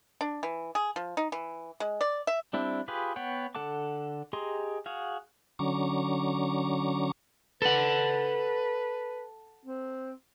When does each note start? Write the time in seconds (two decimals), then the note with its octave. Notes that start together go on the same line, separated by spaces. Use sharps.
0.21 D4
0.43 E3
0.75 G#4
0.96 F3
1.17 D#4
1.32 E3
1.80 G#3
2.01 D5
2.27 E5
2.53 G3 C4 D4 E4
2.88 F4 G4 G#4 B4
3.16 B3 C#5 F#5 G5
3.55 D3 A4 F#5 A5 D6
4.33 G4 G#4 D#5 A#5 C6
4.86 F#4 G#4 F5
5.59 D3 F#3 C#4 A#5 C#6 D6
7.62 A4 B4 F#5
9.65 C4